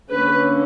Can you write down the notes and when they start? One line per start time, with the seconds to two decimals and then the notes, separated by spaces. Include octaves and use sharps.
0.10 D3 A#3 C#4 B4